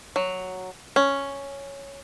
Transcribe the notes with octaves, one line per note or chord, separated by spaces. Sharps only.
F#3
C#4